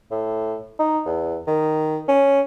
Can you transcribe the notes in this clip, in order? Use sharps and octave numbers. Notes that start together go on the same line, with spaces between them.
A2
D#4
E2
D#3
C#4